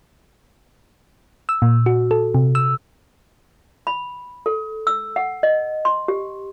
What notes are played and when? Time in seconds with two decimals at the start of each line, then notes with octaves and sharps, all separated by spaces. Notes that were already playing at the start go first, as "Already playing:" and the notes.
1.49 E6
1.62 A#2
1.86 F#4
2.11 A4
2.35 C3
2.55 E6
3.87 B5
4.46 A4
4.87 E6
5.16 F#5
5.43 D#5
5.85 C6
6.08 G4